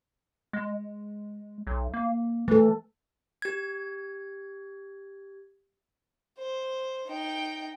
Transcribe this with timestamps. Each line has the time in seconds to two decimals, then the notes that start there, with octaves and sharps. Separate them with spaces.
0.53 G#3
1.67 B1
1.94 A#3
2.48 E3 A3 A4
3.42 G4 G#6
6.38 C5
7.07 D#4 G5